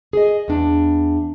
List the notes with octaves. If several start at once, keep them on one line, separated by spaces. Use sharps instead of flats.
G#4 D#5
E2 D4